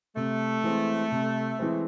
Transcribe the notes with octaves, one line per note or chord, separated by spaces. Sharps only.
C3 A3
E3 G#3 C4
C3
E3 G#3 C4